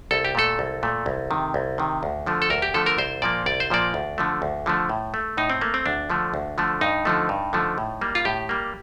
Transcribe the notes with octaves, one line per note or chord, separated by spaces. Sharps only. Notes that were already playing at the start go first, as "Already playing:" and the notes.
C2 A4
G4
A#2 A3 A4
C2
A#2 A3
C2
C3 D#3
C2
C3 D#3
D2
D3 F3 A3
A4
D2 A#4
G4
D3 F3 A3 A4
A#4
C2 C5
A#2 F3 A#3 D5
C2 D5
C5
A#2 F3 A#3 D5
D2
D3 F3 A3
D2
D3 F3 A3
A2
A3
A2 D#4
C4
A3 A#3
C4
D2 D4
D3 F3 A3
D2
D3 F3 A3
G2 D#4
D3 F3 A3
G2
D3 F3 A3
A2
G3 A#3
F4
A2 G4
G3 A#3